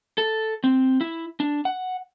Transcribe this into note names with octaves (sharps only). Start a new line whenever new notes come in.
A4
C4
E4
D4
F#5